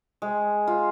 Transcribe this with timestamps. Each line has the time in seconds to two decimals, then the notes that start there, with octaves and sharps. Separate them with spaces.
0.22 G#3
0.67 F4